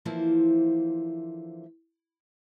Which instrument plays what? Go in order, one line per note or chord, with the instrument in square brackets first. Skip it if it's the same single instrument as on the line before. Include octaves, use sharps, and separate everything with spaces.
[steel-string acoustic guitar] D3 E3 F3 A#3 E4 C5